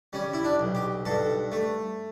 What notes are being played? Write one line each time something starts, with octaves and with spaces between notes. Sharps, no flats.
G3 C#4
E4
D4
B1
G4
G2 A4
A3